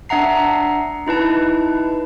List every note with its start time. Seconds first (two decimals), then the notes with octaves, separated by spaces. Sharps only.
0.09 D4 E5 F#5 A#5 C7
1.07 D#4 E4 B4 A5